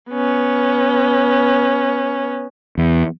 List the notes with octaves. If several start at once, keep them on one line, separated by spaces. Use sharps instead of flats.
B3 C#4
E2